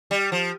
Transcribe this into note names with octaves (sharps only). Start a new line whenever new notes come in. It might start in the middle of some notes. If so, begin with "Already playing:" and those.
G3
F3